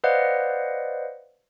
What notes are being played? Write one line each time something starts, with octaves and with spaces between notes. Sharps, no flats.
B4 C5 D5 D#5 F5 F#5